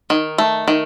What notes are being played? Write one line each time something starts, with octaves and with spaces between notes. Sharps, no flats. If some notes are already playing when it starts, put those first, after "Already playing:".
D#3
A3
D#3